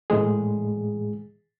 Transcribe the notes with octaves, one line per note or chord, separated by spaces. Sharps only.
A2 E3 G#3 G#4